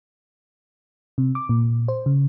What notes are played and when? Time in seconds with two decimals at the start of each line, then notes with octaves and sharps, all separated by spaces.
1.18 C3
1.35 D6
1.49 A#2
1.88 C5
2.06 C#3